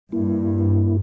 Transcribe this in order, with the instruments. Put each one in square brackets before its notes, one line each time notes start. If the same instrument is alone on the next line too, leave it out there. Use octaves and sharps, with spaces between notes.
[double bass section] G2 [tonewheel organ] A#3 E4